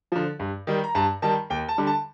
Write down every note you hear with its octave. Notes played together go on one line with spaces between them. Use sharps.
D3 F3
G2
D#3 G3
A#5
G2 A5
D#3 G3 A5
D#2 G5
A5
D3 G3
A5